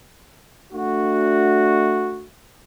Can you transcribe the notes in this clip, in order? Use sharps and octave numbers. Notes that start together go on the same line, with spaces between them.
A3 D4 F#4